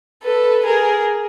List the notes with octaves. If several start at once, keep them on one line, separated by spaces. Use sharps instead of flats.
A4 B4
G#4 A#4